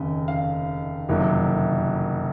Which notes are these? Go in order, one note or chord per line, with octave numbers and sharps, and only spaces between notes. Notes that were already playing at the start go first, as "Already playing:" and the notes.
Already playing: F1 D#2 C#3 D#5
F5
F#1 F2 C3 D#3 F#3